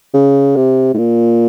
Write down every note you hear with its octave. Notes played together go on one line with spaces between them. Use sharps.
C#3
C3
A2
A#2